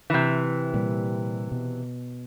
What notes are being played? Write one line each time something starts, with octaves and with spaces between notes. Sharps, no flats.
C3 E3
A#2 G3
B2